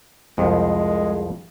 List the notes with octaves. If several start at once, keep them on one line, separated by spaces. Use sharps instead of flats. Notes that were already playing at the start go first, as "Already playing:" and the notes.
C2 F2 G#3